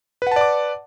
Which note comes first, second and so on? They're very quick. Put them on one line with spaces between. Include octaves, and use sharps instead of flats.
B4 F#5 A5 D5 D6